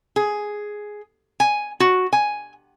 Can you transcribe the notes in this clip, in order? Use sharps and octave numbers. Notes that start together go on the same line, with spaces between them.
G#4
G#5
F#4
G#5